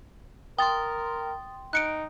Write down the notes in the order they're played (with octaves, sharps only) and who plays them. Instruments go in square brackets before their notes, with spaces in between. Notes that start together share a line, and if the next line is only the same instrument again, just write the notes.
[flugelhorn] A#4 [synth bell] G5 C6 [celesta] D#6 A6
[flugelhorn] D#4 [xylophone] F#6 C#7 D7